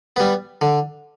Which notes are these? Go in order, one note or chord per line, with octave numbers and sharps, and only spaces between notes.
G3 B3
D3